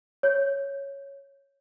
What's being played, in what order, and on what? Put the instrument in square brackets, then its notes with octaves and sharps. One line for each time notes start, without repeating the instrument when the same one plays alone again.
[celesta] C#5 G6